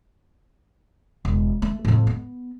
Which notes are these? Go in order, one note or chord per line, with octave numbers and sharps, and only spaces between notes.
E1
A3
F2 A2
B3